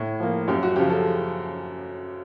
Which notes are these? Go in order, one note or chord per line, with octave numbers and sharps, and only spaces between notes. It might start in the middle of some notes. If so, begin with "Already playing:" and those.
Already playing: A2
F3 A#3
F#2 G4
F#4
C#3 F3 G4
A4